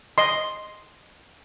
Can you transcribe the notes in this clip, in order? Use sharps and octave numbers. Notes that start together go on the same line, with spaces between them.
D#5 C6